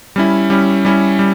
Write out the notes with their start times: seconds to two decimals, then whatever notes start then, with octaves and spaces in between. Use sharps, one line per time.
0.16 G3 C#4 E4
0.50 G3 C#4 E4
0.85 G3 C#4 E4
1.19 G3